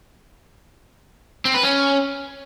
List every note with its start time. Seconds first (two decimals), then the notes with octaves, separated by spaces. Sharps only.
1.45 C4
1.54 B4
1.63 C#4